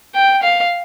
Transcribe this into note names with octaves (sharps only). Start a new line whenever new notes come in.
G5
F5